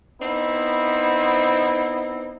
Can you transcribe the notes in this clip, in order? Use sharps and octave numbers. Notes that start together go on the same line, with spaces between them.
B3 C4 D#4 E4